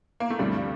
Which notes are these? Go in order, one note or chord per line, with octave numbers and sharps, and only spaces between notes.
A#3
A3
D2 G2 C3 F3 G3